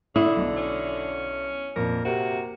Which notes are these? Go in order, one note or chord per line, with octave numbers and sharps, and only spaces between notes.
D3 E4 D#6
B1
C#4
F2 A#2 A#4
C3 A#3 F#4